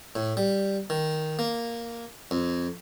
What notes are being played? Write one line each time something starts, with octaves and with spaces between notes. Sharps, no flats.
A2
G3
D#3
A#3
F2